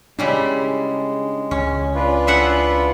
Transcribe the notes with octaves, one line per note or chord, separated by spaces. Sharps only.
C#3 G3 G#3 D4 E4
C#2 C#4
D4 F4 B4
E4 G#4 E5 F#5